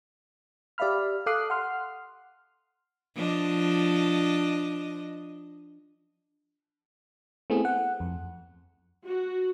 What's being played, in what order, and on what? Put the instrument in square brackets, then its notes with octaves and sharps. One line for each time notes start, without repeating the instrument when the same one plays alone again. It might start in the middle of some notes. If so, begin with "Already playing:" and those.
[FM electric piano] G4 D5 E5 F5 B5 F6
A4 F5 D6 D#6 F#6 C7
F#5 C6 F6
[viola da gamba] F3 D4 D#5
[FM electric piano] A3 B3 C4 E4 G#4
F#5
F2
[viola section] F#4